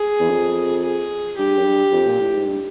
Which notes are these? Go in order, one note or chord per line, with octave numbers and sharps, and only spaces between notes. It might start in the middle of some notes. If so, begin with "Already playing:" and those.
Already playing: G#4
E2
F2
G#4
G2 G4
F#2
G2
F2
A#2
A2
G#2
G2